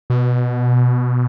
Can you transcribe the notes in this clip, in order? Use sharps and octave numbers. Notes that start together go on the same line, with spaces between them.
B2